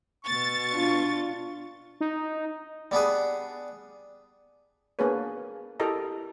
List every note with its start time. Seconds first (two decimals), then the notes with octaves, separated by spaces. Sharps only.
0.25 B2 C#6 A6
0.71 D4 F4
2.01 D#4
2.91 G3 B3 D4 G#4
4.99 A#3 B3 D4 G#4 B4 C#5
5.80 E4 G4 A4 A#4 D#5 A#5